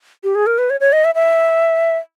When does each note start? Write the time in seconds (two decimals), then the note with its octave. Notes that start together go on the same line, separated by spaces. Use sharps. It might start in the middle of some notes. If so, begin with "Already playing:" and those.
0.24 G4
0.35 G#4
0.46 A#4
0.58 B4
0.70 C#5
0.80 C#5
0.93 D#5
1.05 E5
1.15 E5